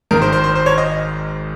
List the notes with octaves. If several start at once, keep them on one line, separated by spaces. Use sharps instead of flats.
G#1 G#2 D#3 A#4
C5
C5
C5
C5
C#5
D#5